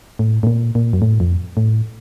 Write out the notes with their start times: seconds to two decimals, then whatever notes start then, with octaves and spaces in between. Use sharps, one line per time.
0.19 A2
0.43 A2
0.47 A#2
0.75 A#2
0.93 F#2
1.02 A2
1.20 F2
1.57 A2